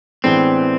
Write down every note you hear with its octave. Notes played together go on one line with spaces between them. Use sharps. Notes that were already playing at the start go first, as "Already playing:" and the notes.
A2 E3 G#3 B3 C4 D4